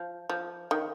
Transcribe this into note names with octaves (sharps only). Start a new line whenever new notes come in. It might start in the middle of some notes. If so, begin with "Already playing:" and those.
Already playing: F3
F3
D#3